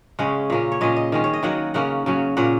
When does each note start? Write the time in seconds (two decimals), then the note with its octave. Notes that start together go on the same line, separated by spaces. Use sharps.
0.19 C#3 G#3 C#4 F#5
0.50 A#2 A#3 C#4
0.72 C#5
0.81 A#2 G#3 C#4 D#5
0.96 D#5
1.12 D#3 G#3 C#4
1.24 C#5
1.33 D#5
1.43 D#3 F#3 A#3 F#5
1.74 C#3 A#3 C#4 F#5
2.06 C#3 F#3 C#4
2.37 A#2 A#3 C#4 F#5